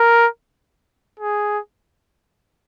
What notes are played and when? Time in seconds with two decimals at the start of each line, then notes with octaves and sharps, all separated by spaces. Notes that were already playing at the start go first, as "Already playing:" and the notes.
Already playing: A#4
1.20 G#4